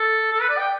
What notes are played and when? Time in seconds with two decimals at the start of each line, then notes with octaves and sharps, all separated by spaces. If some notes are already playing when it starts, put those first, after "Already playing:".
Already playing: A4
0.32 A4
0.41 B4
0.49 D5
0.57 G5